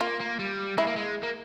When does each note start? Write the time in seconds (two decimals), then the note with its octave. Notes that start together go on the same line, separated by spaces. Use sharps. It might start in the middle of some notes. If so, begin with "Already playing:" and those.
0.01 A#3 F4
0.21 A#3
0.39 G3
0.77 G#3 E4
0.87 A#3
0.96 G#3
1.23 A#3